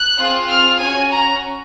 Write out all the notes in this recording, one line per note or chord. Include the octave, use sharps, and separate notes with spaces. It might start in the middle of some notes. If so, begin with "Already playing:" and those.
Already playing: F#6
C4 F4 G#4
F6
C#4 F#4 G#5
A#5